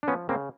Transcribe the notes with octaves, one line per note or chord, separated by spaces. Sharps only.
D4
F3 B3 C#4
C#3 A#3 C4